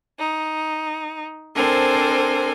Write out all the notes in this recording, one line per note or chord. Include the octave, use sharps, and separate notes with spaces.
D#4
C4 D4 A4 A#4 C5 G#5